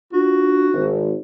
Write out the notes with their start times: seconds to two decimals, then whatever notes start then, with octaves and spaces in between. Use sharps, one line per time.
0.13 D4 F4 F#4
0.73 G#1